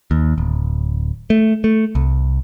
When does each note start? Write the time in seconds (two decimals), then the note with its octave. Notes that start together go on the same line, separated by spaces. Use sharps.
0.11 D#2
0.38 D1
1.30 A3
1.64 A3
1.95 C2